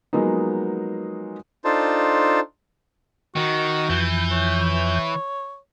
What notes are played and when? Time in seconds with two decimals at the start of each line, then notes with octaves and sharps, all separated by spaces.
0.13 F3 F#3 G#3 A#3 B3 D#4
1.65 D4 D#4 F4 A4 C5 A5
3.36 D#3 F#4
3.89 F2 E3 G6
4.32 C#5